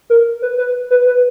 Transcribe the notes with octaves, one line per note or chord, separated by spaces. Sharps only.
A#4
B4
B4
B4
B4